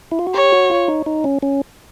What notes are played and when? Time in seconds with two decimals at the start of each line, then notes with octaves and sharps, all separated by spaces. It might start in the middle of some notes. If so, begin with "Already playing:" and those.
0.11 E4
0.19 F4
0.27 F#4
0.34 G4 C#5
0.52 F#4
0.70 F4
0.88 D#4
1.06 D#4
1.24 C#4
1.42 C#4